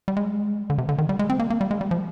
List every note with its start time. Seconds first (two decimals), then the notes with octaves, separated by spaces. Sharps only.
0.08 G3
0.17 G#3
0.70 D3
0.78 C3
0.89 D3
0.98 D#3
1.09 G3
1.19 G#3
1.30 C4
1.40 A#3
1.50 A#3
1.61 G3
1.71 G#3
1.81 G3
1.91 F3